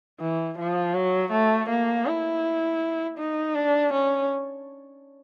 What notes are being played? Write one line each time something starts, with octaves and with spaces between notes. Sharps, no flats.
E3
F3
F#3
A3
A#3
E4
D#4
D4
C#4